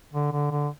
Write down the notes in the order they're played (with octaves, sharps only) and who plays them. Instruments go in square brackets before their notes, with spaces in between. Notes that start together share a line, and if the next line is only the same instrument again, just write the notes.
[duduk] D3
D3
D3